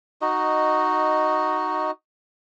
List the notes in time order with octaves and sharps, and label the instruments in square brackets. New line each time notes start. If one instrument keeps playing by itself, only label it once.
[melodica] D#4 F#4 D#5